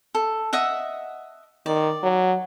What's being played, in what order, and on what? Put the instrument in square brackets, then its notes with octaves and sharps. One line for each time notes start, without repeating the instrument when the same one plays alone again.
[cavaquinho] A4
D#5 E5 F#5
[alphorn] D#3 [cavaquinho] D5
[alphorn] F#3